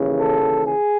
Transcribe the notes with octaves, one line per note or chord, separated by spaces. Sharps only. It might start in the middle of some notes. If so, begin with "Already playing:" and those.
Already playing: D#2 C#3 E3
A4
G#4